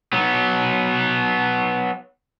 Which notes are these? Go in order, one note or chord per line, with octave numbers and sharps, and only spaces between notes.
F#3 B3